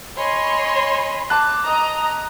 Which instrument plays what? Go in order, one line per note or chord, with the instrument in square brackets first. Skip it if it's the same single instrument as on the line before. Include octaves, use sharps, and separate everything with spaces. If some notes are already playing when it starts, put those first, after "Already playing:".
[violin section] C#5 C6 [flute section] D#5 G#5 B5
[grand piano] A5 F#6 [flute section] D6
[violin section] D#5 A#5 [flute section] D#6